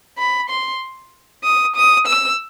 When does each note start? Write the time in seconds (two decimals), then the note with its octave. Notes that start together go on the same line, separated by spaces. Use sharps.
0.18 B5
0.50 C6
1.44 D#6
1.76 D#6
2.07 E6